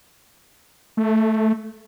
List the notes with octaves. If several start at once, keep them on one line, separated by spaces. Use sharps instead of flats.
A3